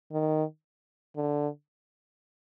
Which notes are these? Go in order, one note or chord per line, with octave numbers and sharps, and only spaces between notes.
D#3
D3